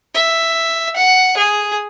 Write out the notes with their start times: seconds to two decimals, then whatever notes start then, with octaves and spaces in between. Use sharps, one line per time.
0.14 E5
0.96 F#5
1.37 G#4